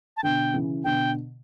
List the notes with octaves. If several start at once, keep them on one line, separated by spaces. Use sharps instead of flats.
A5
B2 D3 G5
C#3 E3
B2 D3 G5